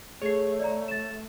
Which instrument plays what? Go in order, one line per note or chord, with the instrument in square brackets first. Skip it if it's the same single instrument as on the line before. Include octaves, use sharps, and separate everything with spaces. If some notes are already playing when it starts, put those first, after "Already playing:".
[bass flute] A3 [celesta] G#4 C7 [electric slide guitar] C#5
[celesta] D5 A#5
A6 E7